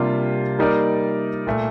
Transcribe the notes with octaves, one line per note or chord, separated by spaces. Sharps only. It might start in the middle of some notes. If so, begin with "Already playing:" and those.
Already playing: C3 G3 A#3 D4 F4
G3 A#3 D#4 A#4 D5
A#2 A3